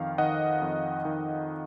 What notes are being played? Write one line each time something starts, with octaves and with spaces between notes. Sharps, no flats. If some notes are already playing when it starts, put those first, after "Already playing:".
Already playing: F2 D#3 F5
D#3 D#5 F#5
F2
D#3